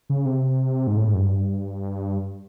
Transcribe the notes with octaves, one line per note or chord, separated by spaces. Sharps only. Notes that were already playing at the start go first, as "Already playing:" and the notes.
C#3
C3
G#2
A2
G#2
F#2
G2